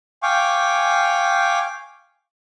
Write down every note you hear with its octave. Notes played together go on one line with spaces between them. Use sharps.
F5 G5 G#5 C#6 D6